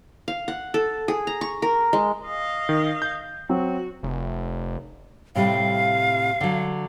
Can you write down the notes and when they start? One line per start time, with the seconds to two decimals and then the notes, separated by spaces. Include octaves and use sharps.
0.28 F5
0.48 F#5
0.74 A4
1.08 G#4
1.27 A#5
1.41 C#6
1.62 A#4
1.93 G#3
2.26 D#5 F5
2.69 D#3
3.02 G6
3.49 F#3 C4 F#4
4.03 F1
5.35 A2 C3 G3 F5
6.41 D3 F#3